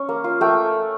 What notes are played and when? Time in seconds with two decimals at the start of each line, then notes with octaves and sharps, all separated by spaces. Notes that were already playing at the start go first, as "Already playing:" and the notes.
Already playing: C#4
0.09 A#3
0.24 F4
0.41 A3 G5